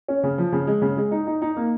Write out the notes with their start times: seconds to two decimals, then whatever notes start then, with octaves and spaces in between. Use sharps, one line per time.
0.08 C#4
0.23 C#3
0.38 F3
0.52 C#3
0.67 G#3
0.82 C#3
0.97 G#3
1.11 D#4
1.27 D#4
1.42 D#4
1.56 A#3